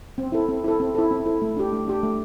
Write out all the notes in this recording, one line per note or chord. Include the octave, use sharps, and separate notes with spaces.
C4
E4 A4
C4
E4 A4
C4
E4 A4
C4
E4 A4
A3
D4 G4
A3
D4 G4
A3